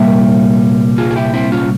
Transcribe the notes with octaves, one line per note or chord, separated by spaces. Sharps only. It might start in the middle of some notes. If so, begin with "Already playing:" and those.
Already playing: C2 A#2 G3 A#3 E5 G5
F4 G#4
G#4
E4 G4
C4 E4
C#4 F4